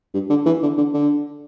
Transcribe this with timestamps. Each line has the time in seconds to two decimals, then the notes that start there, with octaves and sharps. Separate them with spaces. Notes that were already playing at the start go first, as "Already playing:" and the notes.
0.14 G2
0.30 D3
0.46 E3
0.62 D3
0.77 D3
0.94 D3